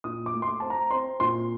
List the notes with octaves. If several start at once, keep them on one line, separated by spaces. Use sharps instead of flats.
A#2 D#6
D6
A3
C6
D6
C4 A5
A#5
C4 C6
A#2 C6